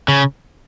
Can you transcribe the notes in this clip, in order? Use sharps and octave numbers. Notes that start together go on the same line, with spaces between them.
C#3